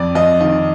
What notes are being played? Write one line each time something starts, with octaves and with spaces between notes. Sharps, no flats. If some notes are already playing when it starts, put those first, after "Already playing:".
Already playing: F2 D5
F2 D#5
D#3 D#5